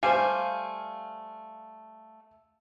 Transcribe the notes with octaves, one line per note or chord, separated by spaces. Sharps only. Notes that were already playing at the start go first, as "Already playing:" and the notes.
G3 A3 C5 F5 G#5